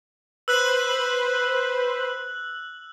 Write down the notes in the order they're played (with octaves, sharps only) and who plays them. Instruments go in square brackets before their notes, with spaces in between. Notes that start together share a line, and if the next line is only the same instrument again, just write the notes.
[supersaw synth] B4 C5 [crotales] E6 F#6 F#7